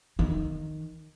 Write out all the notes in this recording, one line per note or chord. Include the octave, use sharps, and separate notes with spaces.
D#3